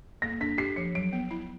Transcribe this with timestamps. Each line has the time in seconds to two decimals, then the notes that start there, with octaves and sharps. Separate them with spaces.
0.22 A#3 A#6
0.40 D4 B6
0.58 G4 C7
0.76 F3 C#7
0.95 F#3 D7
1.13 B3
1.31 E4